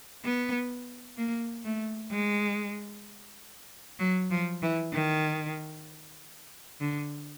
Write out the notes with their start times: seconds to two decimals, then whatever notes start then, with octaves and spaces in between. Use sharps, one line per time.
0.24 B3
1.18 A#3
1.65 A3
2.11 G#3
3.99 F#3
4.30 F3
4.62 E3
4.93 D#3
6.81 D3